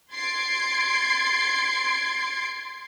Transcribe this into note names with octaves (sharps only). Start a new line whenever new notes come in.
C6 G#6 A6 C7 D7